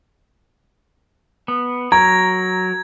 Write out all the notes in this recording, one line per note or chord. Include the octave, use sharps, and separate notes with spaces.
B3
F#3 A#4 A#5 G#6